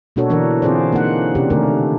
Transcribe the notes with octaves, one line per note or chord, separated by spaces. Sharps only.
B2 A#3 D4 F#4 A4 C#5
D3 E3 D4 A#4
D3 C4 F4 G#4 C5 D5
A#3 D#4 F#5
C3 C#4 D4 G4
D3 D#3 A3 D4 A4 A#4